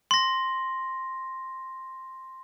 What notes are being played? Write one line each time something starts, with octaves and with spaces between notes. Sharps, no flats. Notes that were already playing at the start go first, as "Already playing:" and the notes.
C6 A#6